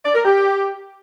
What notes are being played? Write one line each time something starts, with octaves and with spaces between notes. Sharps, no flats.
D5
A#4
G4